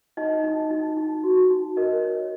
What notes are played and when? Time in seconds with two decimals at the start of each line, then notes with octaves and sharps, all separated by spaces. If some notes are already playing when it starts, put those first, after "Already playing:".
0.17 D#4 D#5
0.44 D#4
0.71 D#4
0.97 D#4
1.24 F#4
1.50 D#4
1.77 A#4 D#5
2.03 C#5